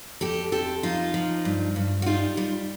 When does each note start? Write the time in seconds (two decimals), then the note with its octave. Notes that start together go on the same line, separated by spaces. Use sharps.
0.21 F2 G4 A4
0.52 F2 G4 A4
0.83 F3 D#4 F4
1.14 F3
1.45 G2
1.76 G2
2.02 F#4
2.06 G3 D#4 F4
2.37 G3